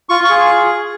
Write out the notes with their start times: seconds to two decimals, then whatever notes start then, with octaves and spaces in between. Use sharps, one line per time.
0.09 F4 C#6
0.25 C#6
0.30 G#4